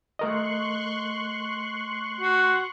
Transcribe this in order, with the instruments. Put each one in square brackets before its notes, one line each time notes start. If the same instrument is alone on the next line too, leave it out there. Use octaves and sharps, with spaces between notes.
[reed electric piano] A3 A#4 D#5 [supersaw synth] C6 C#6 F#6
[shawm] F#4